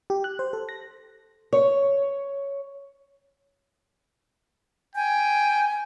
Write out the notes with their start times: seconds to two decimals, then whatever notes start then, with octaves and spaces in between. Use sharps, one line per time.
0.10 G4
0.24 F#6
0.39 C5
0.53 A4
0.69 A#6
1.53 C#5
4.96 G5 G#5